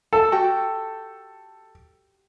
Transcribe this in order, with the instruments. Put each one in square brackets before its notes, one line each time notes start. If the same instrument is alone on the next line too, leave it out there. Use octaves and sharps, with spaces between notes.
[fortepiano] A4 [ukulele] A5
[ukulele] F#4 G4 G5